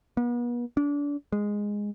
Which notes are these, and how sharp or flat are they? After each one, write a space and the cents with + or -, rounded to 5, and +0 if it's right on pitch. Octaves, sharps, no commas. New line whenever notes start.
B3 -40
D4 -30
G#3 -10